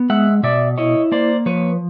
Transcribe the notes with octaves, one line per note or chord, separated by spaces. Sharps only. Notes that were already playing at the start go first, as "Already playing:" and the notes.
Already playing: B3
G#3 E5 F#5
B2 D5 E5
E4 C#5 D#5
A#3 C5 D5
F3 B4 C#5